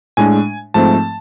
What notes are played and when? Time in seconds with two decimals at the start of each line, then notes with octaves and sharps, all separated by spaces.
0.17 A2 G#3 D4 G#5
0.74 G#2 F3 A3 C4 A5